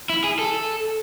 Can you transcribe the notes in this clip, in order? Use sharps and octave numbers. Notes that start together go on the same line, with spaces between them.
E4
G#4
A4